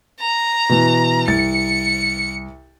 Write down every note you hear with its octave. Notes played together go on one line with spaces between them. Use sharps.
A#5
B2 E3
C2 A6 C#7